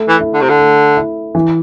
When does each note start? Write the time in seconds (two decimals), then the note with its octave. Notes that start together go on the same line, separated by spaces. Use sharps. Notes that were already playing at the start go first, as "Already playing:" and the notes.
Already playing: A3
0.09 E3
0.21 E4
0.34 D3
0.42 C3
0.50 D3
0.59 A3
0.97 E4
1.35 E3